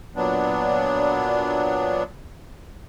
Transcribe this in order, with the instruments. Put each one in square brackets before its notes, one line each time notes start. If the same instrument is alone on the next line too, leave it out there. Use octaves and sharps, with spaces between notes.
[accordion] A#2 F#3 B3 D4